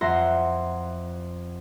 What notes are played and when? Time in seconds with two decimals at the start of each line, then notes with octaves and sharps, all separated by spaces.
0.01 F2 E5 F#5 A#5 C6 A#6